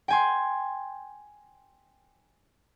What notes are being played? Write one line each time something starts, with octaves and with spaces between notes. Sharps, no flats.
G5 G#5 C6